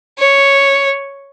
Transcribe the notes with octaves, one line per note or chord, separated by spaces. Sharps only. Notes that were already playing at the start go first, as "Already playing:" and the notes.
C#5